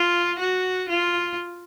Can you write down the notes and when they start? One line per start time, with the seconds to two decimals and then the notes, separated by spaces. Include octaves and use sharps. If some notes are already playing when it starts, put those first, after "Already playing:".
Already playing: F4
0.39 F#4
0.89 F4